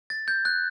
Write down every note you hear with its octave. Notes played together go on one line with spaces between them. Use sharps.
A6
G6
F#6